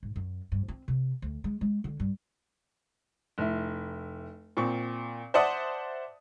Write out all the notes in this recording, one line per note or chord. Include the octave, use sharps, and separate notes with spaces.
G#2
F#2
G2
C4
C3
D2
G#3
G#3
D3
G2
F1 E4
A#2 C4 C#6
C5 D5 E5 F#5 A5 D#6